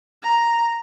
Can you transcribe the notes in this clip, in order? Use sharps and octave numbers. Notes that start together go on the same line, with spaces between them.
A#5